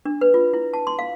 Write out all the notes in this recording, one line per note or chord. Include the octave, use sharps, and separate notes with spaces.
D4
B4
F4
E4
A5
C6
F5